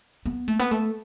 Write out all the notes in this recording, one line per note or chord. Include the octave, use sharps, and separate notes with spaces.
B3
A3
B3
A3